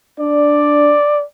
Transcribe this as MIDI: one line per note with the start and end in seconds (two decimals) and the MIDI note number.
0.20 0.95 62
0.20 1.23 74